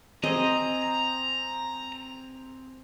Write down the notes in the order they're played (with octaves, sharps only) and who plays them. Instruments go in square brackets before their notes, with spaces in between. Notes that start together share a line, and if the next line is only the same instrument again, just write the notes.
[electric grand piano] C4 G#4 C5 [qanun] D#5 [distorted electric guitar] A#5